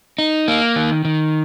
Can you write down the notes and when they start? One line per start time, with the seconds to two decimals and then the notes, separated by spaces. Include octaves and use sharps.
0.19 D#4
0.48 A#3
0.76 D#3
1.05 D#3